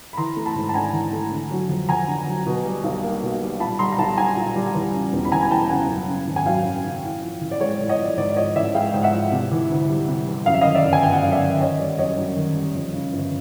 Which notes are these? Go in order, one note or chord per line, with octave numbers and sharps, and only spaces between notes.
B5
E3 A#5 C6
A3
A5 B5
G#2
A5
D4 G#5 A#5
E3
A3
D3
F#3
F2
F2 G#5 A#5
D3
F#3
B2
G3
B1
A#3
B2
G3
A#2 A5 B5
G3 A#5 C6
A#5
B1 A5 B5
B1 G#5 A#5
A#2
G3
E2
C#3
E1
B5
E3 G#5 A#5
G#5
E2 G5 A5
C#3 F#5 G#5
F#2
C#3
G#1
G#5
F#3 F5 G5
F#2
C#3
A2
F3
A1
D5
G#3 C#5
D5
A2
C#5 D#5
F3 D5
G#2 D5
D5
F3 C#5 D#5
A1 D5 E5
G#3 F5 G5
G#2 G5
E5 F#5
F3
C3
E3
D2
G3
C3
E3
F#2 F5
E5
D#3 D#5 F5
D5 E5
G1
G#5
G1 G5
F#5
F#2 F5
D5 E5
D#3
D#3 C#5 D#5
G3 D5
F#2 C#5 D#5
F#2
D#3
G3
F2
C#3
G1